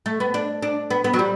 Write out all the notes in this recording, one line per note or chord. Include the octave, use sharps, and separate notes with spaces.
A3
B3
D4
D4
B3
B3
F#3
G3